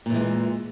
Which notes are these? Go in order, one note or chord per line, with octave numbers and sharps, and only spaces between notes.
A#2 E3 G#3